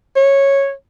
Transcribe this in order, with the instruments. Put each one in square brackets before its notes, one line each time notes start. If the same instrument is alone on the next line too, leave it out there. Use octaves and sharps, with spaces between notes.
[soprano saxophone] C#5